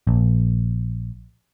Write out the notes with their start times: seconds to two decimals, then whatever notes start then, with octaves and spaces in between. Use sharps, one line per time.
0.07 A#1